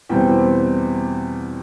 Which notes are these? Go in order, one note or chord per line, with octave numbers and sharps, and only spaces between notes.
E2 B2 G3 C4 G5